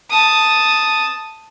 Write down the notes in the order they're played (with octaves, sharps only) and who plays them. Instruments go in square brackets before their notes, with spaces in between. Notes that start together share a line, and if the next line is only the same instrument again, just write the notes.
[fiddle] A5 D#6